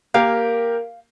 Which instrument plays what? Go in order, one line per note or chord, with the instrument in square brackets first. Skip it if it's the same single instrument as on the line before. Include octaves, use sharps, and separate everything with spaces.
[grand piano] A#3 G4 A#4 [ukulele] F5